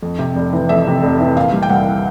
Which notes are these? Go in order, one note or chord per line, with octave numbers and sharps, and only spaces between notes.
F2
C3
F1
E3
F2 E5
C3
F1
E3
A#2 F5
G3
G5
C2 F#5